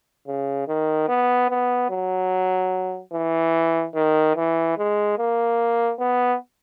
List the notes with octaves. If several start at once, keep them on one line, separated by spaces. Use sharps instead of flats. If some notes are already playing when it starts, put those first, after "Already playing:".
C#3
D#3
B3
B3
F#3
E3
D#3
E3
G#3
A#3
B3